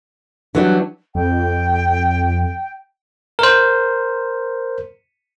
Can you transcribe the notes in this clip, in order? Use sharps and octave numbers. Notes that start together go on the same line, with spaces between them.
E3 F#3 G3 D4
F2 G5
A#4 C5